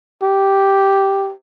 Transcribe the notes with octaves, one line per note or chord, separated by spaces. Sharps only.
G4